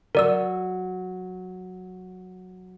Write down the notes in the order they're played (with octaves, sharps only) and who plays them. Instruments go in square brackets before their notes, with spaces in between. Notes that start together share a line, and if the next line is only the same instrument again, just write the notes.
[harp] F#3 [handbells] A#4 D5 E6